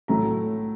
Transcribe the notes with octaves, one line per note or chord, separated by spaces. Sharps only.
A2 F#3 A3 A#5